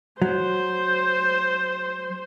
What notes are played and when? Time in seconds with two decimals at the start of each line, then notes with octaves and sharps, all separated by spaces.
0.22 F#3 C5